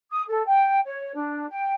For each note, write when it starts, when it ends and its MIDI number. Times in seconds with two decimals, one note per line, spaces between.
0.11 0.22 87
0.28 0.42 69
0.46 0.80 79
0.85 1.11 73
1.14 1.48 62
1.48 1.73 79